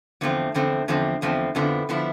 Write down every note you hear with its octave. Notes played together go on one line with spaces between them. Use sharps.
E2 D3 F3 A3 C4
E2 D3 F3 A3 C4
E2 D3 F3 A3 C4
E2 D3 F3 A3 C4
F2 D3 F3 B3 E4
D3 F3 B3 E4